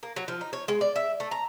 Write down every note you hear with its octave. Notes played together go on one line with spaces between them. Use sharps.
A#3
F#3
F3
D#4
C#5
G#3
D5
E5
A3
A#5